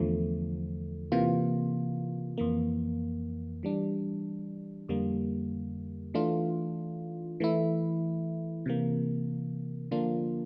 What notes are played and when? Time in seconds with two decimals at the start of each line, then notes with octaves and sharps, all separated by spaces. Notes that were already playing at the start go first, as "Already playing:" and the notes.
Already playing: E2 D3 F3 A3
1.12 C3 E3 A#3 F4
2.38 F2 E3 A#3
3.63 E3 G3 D4
4.89 F2 D3 G3 A#3
6.14 E3 A3 D4 F4
7.40 E3 A3 E4
8.66 C3 E3 A#3
9.91 D3 F3 A#3 D4 F4